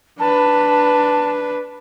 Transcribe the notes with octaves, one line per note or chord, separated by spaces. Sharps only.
D4 B4 A5